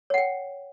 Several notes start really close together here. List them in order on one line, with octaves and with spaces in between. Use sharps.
C#5 F#5 G5